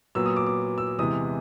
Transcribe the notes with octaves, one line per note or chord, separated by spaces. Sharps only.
A#2 F#3 B3 E6
D#6
D6
D6
E6
E2 C3 E3 G#3 D#6